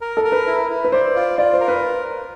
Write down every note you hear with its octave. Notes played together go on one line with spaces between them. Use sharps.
A#4
A4
A#4
B4
E4
E4
B4
C5 D5
F4
F4 D5
C5
A#4
B4